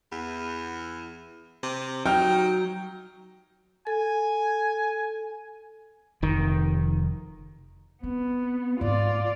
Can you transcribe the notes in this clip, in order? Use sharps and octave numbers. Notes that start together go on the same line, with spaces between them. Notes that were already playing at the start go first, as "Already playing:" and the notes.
E2
C3
F#3 D#4 G5 F6
A4 G#5
F1 D#3
B3 C4
G#2 D#4 F4 D5